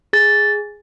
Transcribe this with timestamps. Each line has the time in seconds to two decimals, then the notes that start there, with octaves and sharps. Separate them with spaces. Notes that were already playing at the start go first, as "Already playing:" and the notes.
0.13 G#4 A6